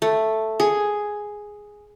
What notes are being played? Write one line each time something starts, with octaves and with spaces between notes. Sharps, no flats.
A3
G#4